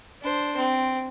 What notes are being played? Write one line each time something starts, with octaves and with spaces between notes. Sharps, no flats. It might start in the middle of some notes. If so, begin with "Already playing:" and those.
D4 C5
C4